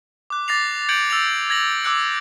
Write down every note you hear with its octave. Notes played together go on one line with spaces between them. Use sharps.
D6 F#6
D6 A6 A#6 C7 F7
G6 G#6 C#7 D7 F#7
E6 A6 F7
G#6 A#6 F#7
D6 E6 F#6 C#7